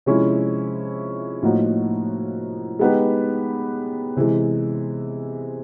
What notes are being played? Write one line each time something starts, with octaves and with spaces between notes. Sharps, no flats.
C3 F3 G#3 C#4 E4
A2 F3 A#3 D#4 F#4
G#3 B3 D#4 G4 B4
C3 E3 G#3